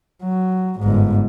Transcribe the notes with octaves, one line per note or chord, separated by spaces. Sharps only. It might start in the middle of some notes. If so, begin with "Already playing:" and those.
F#3
G1 G#2